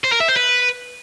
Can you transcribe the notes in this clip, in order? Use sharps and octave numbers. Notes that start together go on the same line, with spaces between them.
C5
A#4
E5
C5
B4